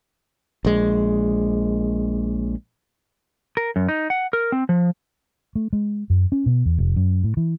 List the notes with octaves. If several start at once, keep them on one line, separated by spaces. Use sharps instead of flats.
A#1 G#3
A#4
F#2
D#4
F#5
A#4
C4
F3
A3
G#3
F#2
C#4
B2
E2
F1
F#2
A2
E3